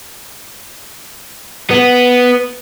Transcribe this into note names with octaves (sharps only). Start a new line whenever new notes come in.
B3